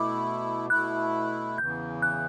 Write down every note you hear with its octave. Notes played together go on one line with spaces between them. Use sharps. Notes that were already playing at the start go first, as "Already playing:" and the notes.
Already playing: B2 A3 E4 D6
B2 A3 E4 F#6
E2 C#3 E3 G6
F#6